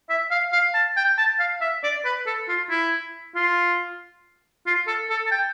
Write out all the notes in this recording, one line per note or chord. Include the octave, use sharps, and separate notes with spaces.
E5
F5
F5
A5
G5
A5
F5
E5
D5
B4
A4
F4
E4
F4
F4
A4
A4
A5
G5